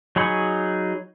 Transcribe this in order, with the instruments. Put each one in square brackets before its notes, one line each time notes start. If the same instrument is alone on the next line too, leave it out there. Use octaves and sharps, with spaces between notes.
[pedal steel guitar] F#3 D#4 G#4 B5 C#6